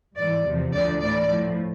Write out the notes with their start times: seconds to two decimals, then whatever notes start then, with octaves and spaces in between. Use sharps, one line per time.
0.17 G#2 E3 D5
0.45 E2 C3 F3
0.73 D2 D3 F3 D5
1.01 A2 E3 D5
1.29 A2 F3